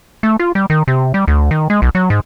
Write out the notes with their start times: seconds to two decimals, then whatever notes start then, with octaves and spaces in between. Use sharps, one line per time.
0.23 A3
0.40 F4
0.55 G3
0.70 D#3
0.88 C3
1.14 G3
1.28 D2
1.51 D#3
1.70 G#3
1.82 B1
1.95 F#3
2.10 G#2